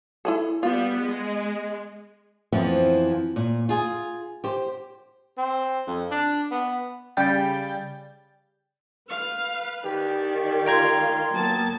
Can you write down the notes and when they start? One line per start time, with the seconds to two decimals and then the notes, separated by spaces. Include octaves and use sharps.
0.25 E4 G#4 A4
0.63 G3 B3 F4
1.02 G#3
2.52 F2 E3 F3 B3 C4
3.36 A#2
3.69 F4 G#4
4.44 G4 C5
5.38 C4
5.87 F2
6.11 D4
6.51 B3
7.17 C#3 G3 G5 G6 A6
9.10 B4 F5
9.85 D#3 G4 D5
10.66 F4 F5 G5 A#5 C6 G#6
11.33 F#3 A#3 B3 A5